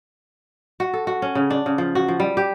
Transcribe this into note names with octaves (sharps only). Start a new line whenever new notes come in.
F#4
A4
F#4
C#4
C#3
D4
C#3
F3
F#4
F3
G3
G4